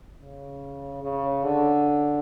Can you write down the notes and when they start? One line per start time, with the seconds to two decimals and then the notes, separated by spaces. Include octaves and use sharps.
0.21 C#3
1.03 C#3
1.44 D3